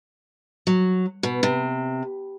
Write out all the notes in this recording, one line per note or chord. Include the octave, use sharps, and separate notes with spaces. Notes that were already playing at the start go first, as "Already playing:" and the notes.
F#3
B2
C3